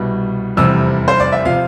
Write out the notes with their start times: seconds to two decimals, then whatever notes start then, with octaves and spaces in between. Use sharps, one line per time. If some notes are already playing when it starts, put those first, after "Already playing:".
Already playing: C2 B2 G3
0.57 F1 E2 C3 G3 E6
1.08 C5
1.20 D5
1.32 E5
1.45 C3 F3 F5